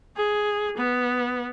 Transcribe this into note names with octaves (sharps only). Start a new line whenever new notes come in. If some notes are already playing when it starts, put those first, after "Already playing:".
G#4
B3